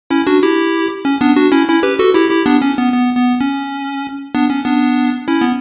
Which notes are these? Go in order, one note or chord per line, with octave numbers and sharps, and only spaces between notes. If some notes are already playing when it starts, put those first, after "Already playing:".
C#4 E4
D4 F#4
E4 G4
C#4
B3 D4
D4 F#4
C#4 E4
C#4 E4
G4 B4
F#4 A4
E4 G4
E4 G4
B3 D4
C#4
B3
B3
B3
C#4
B3 D4
C#4
B3 D4
C#4 E4
B3